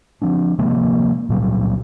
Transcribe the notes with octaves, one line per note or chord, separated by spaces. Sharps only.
F3 C4 D4
C3 F3 G#3 A#3
C#2 A#2 F#3 G3